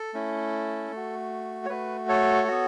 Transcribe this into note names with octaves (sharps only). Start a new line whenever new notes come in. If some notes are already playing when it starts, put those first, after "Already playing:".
Already playing: A4
A3 C#4 E4
A3
F#4
C#5
A3 F#4 B4
A4 C#5
B3 F#4